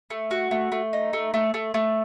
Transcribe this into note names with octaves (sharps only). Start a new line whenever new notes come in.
A3
F#4
A3
A3
D#4
A3
A3
A3
A3